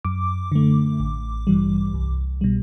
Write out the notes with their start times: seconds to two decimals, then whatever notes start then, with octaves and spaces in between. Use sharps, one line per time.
0.05 F#2 D6
0.52 D3 A3
1.00 A1
1.47 G2 E3 G3
1.94 C2
2.41 B2 G3